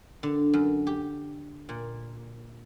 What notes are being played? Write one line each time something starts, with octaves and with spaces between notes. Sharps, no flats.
D3
F#2
G4
A#2